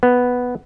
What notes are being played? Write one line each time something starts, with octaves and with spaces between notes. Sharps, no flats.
B3